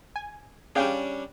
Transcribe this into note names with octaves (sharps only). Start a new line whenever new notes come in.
G#5
G3 C#4 D4 G#4 F5 G5